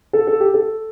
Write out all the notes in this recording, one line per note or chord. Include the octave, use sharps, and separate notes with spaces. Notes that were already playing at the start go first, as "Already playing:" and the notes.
A4
A4
G4
A4